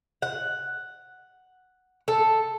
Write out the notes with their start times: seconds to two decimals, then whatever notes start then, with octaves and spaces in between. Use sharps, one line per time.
0.22 F#5
2.08 A4